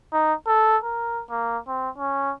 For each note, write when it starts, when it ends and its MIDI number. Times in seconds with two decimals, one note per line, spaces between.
0.13 0.33 63
0.47 0.77 69
0.83 1.22 70
1.30 1.58 58
1.67 1.90 60
1.98 2.32 61